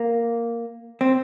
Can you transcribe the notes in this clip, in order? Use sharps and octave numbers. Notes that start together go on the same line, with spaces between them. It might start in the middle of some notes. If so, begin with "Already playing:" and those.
Already playing: A#3
C4